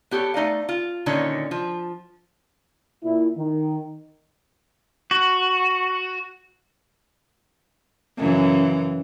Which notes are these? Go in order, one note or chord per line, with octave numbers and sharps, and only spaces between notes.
B3 G4 A4 C#5
A3 D#4 D5 F5
F4
A#2 D3 D#3 C#4 D#4
F3
A#2 E4
D#3
F#4
F#2 C#3 E3